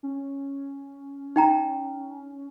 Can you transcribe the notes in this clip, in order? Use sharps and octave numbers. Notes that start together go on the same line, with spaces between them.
C#4
D#4 G5 A#5